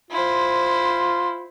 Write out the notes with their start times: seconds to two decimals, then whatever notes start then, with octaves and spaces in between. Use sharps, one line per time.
0.11 E4 F4 C5